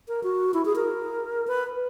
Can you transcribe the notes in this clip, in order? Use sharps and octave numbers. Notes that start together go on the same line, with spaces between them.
A#4
F#4
E4
G#4
A#4
B4